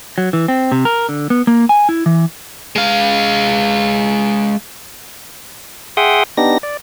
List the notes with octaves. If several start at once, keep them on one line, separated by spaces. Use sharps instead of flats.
F#3
E3
C4
C3
A#4
D3
B3
A#3
G#5
E4
E3
G#3 F5
G#4 E5 F#5 G5 C6 D#6
B3 D4 D#4 G4 A#6
D5